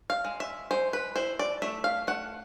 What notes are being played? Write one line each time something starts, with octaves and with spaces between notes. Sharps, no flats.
F5
G#3
E5
G#3 C5
B4
E4 C5
D5
A3 E5
F5
A3 F#5